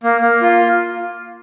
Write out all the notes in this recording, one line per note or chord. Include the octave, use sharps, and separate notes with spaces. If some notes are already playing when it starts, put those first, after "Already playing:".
A#3
A#3
F4